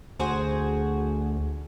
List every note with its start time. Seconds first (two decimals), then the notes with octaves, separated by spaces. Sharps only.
0.19 D2 F#4 G#4 C5